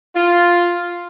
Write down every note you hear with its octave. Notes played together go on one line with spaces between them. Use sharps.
F4